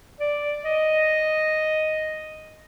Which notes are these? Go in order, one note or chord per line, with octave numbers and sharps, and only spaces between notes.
D5
D#5